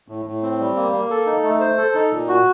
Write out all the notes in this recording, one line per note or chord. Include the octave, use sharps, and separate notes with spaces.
A2
A2
C4
G3
A#3
A#3
A4
D#4
A3
C5
A4
D#4
A#2
F#4